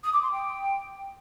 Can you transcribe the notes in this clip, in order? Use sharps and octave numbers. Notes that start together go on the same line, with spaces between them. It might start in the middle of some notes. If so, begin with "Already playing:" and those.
D#6
D6
C6
G5